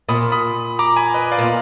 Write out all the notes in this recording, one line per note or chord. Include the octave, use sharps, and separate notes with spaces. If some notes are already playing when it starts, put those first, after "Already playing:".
A#2 B5 D#6
B5 D#6
A#5 D6
G#5 B5
B4 D#5
D5 F5
A#2